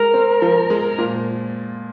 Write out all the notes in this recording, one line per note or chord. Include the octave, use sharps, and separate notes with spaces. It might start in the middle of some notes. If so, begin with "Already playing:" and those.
Already playing: G#3 A#4
C4
F3
G#3
A#2